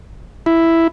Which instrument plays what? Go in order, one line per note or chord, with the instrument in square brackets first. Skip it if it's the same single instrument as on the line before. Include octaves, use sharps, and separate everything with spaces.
[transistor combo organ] E4